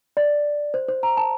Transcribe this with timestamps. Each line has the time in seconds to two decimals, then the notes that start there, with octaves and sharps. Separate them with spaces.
0.17 D5
0.74 C5
0.88 C5
1.03 A#5
1.17 A5